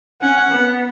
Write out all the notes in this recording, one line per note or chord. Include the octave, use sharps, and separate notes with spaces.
C#4 F#5
F#5
B3